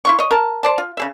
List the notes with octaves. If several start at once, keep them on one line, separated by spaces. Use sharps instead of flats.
E4 F4 C#6
C#5 D#5
A#4 A5
C5 D5 A5
F4
C#3 G#4 E5